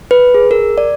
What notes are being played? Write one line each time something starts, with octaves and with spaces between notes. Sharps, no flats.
B4
G#4
A#4
D5